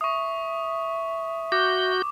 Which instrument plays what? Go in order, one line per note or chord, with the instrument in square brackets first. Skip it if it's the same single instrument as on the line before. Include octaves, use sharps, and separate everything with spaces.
[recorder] E5 [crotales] C#6 D#6
[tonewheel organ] F#4 G6 [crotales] D6